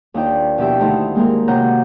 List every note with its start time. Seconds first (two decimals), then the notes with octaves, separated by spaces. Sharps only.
0.14 D#2 D4 D#4 F4 G5
0.58 B2 F3 E4 G4 E5 G5
0.79 D2 D#3 A3 D#4 E4 C5
1.15 G#3 A#3 C4 G#4 A#4
1.48 C3 F#4 C#5 F#5 A#5 G6